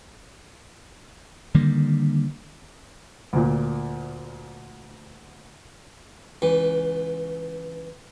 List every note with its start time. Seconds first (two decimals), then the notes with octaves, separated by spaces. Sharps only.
1.54 D3 D#3 G3 A#3
3.33 D2 A#2
6.42 C#2 E3